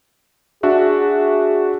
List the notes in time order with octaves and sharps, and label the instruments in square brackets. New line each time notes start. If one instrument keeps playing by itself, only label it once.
[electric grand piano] D4 F#4 E5 [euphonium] G#4